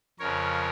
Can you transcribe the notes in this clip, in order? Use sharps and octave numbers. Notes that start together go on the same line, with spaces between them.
F2 C#3 F3 A#4 C#5